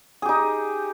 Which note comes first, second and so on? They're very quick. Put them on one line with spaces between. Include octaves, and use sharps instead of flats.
G#4 G4 D#4